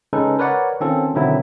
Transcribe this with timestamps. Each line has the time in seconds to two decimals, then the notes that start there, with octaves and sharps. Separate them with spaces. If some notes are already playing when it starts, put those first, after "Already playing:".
0.13 C#3 G#3 C#4 D#4 A4 B4
0.39 A#4 B4 C#5 D5 F#5
0.81 D#3 C4 C#4 F4 A4
1.14 B2 D3 D#3 F#3 C4 E4